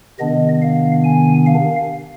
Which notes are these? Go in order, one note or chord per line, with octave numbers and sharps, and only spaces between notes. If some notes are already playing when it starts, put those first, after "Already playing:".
C3 D#3 B3 D4 D#5
F5
G#5
F5